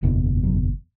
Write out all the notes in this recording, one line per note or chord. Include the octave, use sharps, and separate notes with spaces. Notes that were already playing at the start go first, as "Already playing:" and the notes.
F#1 E2 B2 E3
F#3